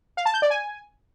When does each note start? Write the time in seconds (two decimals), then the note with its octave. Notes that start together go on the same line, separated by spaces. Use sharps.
0.17 F5
0.26 A5
0.34 G6
0.42 D5
0.50 G#5